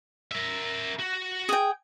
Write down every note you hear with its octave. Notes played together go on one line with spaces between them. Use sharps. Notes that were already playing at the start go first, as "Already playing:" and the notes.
A#4 E5
F#4
G#4 G5